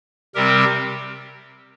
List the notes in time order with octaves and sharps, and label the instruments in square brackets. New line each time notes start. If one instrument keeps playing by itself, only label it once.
[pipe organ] C3 G3 C4 G4 A#4